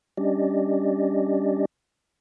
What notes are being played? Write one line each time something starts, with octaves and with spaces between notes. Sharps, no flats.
G3 C#4 D4 G4 D5 D#5